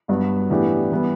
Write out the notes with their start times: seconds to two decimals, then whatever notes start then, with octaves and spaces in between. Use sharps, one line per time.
0.08 G2 F#3 B3 F#4
0.50 A2 E3 B3 D4 G4
0.92 E3 G3 B3